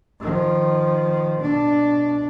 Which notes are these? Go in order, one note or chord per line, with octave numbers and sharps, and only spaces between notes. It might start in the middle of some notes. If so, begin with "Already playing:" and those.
D#3 F3
B2 D4